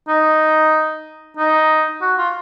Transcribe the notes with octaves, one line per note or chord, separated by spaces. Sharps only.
D#4
D#4
F#4
F4